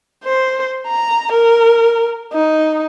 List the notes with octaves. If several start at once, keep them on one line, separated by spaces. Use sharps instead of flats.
C5
A#5
A#4
D#4